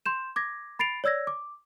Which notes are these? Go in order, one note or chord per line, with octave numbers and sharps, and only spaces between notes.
C6 G6 E7
D6 G#6 A#6
B5 A6 C7 D7 F7
C#5 D5 E6 G#6 A#6
D6